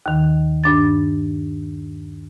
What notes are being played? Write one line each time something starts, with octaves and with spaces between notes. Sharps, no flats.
D#2 D#3
G2 D4 A6